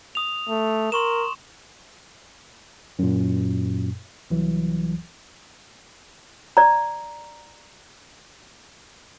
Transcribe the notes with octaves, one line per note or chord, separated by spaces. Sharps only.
D#6 F7
A3
A#4 C6 C#6 E7
F#2 A#2
C2 E3 F#3
D5 A#5